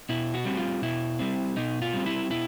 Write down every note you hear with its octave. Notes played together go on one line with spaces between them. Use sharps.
B2 E4
F#4
G3 C4
F4
B2 E4
G3 C4
B2 D#4
F4
G3 C4
E4
B2 E4